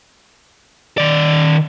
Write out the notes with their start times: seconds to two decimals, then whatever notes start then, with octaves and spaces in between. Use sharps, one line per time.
0.98 D#3 D5